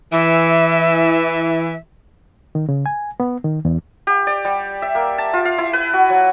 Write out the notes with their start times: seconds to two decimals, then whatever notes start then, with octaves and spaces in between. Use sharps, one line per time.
0.12 E3 E5
2.55 D#3
2.69 C#3
2.86 G#5
3.20 B3
3.44 D#3
3.65 E2
4.07 G4
4.27 D5
4.45 G3
4.82 E5
4.95 A#3
5.18 A5
5.33 F4
5.45 F5
5.58 E4
5.73 B4
5.94 F#4
6.10 F#3